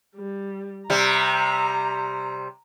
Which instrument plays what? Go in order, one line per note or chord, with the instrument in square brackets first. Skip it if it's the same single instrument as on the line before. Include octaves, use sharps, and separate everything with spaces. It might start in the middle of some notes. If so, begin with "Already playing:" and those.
[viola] G3
[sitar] C3 G3 [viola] A#5